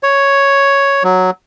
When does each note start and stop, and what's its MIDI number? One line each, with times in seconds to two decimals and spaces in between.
0.03 1.03 73
1.04 1.30 54